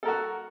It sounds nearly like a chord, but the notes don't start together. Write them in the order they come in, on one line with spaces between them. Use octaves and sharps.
A4 A#4 F#4